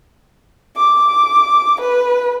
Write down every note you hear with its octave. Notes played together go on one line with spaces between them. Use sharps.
D6
B4